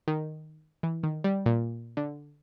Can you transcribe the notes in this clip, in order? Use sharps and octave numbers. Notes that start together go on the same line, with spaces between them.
D#3
E3
D#3
G3
A#2
D3